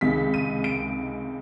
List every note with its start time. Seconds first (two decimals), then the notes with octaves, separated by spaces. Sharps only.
0.01 C#2 C3 D#3 G#3 B6
0.34 D#7
0.64 D7